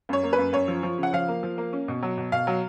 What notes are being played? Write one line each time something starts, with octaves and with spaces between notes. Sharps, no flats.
F#2 C#5
A#3
B4
F#2
F#2 C#5
F3
F3
C#3
F#5
F3 F5
A#3
F3
A#3
C#4
B2
F#3
B2
B2 F5
F#3